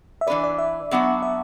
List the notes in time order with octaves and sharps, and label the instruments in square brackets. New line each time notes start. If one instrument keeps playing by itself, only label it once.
[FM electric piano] E5
[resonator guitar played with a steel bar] E3 D4 B4 [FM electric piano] D5
[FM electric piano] D5
E5
[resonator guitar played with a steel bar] F#3 B3 D4 F#4
[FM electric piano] E5